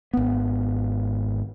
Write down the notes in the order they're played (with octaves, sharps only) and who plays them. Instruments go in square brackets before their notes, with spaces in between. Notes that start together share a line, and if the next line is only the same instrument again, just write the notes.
[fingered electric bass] G#1 B3